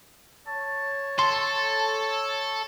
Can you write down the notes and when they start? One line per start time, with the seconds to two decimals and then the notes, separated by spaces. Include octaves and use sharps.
0.47 C#5 A5
1.19 A4 C6